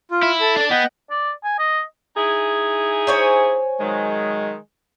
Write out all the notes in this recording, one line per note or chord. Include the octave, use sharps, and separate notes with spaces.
F4
E4
A4
D4 D5
B3 D#5 F#5 G5
D5
G#5
D#5
D#4 E4 G#4
C5 C#5 G#5
D#3 F#3 G#3